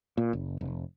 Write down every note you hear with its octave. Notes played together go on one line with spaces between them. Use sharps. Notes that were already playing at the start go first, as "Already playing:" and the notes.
A#2
F#1
F1